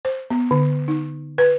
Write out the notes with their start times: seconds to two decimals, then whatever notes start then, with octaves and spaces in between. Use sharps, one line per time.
0.05 C5
0.31 B3
0.51 D3
0.88 D#4
1.38 B4